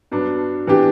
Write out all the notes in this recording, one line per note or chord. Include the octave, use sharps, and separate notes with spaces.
G2 F#3 B3 D4
E3 B3 D4 G4